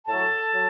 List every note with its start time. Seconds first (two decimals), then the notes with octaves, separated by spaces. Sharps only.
0.07 A2 F#3 A4 A5
0.54 F#3